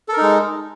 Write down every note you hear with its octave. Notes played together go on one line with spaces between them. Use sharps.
G#3 D#4 A4 A#4